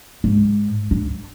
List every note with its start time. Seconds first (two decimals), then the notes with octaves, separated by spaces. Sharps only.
0.24 G#2
0.91 D4